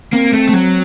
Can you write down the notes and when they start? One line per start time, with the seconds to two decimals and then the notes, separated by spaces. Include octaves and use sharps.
0.13 A#3 C4
0.33 A3
0.49 A3
0.53 F#3